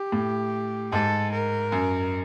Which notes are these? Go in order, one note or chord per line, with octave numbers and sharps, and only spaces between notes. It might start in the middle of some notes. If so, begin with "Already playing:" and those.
Already playing: G4
A2
G#2 A4
A#4
F#2